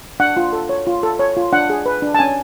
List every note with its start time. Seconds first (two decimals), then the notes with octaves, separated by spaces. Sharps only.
0.20 D4 F#5
0.37 F4
0.53 A4
0.69 C#5
0.87 F4
1.03 A4
1.19 C#5
1.37 F4
1.53 D4 F#5
1.70 G#4
1.86 B4
2.02 D4
2.14 A5
2.19 C#4 G#5